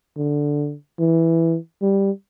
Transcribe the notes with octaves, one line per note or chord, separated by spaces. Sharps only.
D3
E3
G3